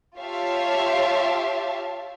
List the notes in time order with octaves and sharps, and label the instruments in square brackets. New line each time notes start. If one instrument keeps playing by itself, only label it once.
[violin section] F4 G4 C#5 E5 F5 A5